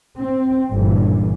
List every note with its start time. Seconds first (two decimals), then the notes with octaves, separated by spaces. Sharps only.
0.19 C4
0.70 G1 C#2 A#2 D3 E3